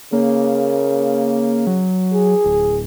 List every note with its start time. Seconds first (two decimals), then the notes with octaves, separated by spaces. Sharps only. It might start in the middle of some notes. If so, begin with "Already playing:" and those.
0.13 C#3 A#3
1.67 F#3
2.13 G#4
2.45 D1